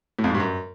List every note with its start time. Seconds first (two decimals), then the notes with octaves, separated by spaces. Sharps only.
0.19 A2
0.24 F2
0.29 G#2
0.35 G2
0.40 F#2